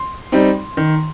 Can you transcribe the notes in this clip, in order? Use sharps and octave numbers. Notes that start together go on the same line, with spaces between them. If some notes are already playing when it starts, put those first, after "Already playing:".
Already playing: C6
G3 C4 D#4
D#3